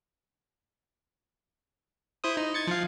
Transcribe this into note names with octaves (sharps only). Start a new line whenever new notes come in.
E4 C5 D#6
D#4
G#6 A6 C#7
F3 F5